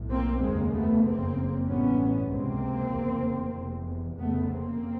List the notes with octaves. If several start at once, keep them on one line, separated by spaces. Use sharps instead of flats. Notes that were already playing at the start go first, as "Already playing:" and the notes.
Already playing: B1 A2
A#3 C4
F1 D#2 C#3 G#3 A#3
A3 B3
F#1 F2 C#3 A#3 C4
A1 G2 B3 C#4
C#2 C3 A#3 C4
F1 E2 C#3
F1 E2 C3
F1 F2 C#3 A3 B3
A#3 C4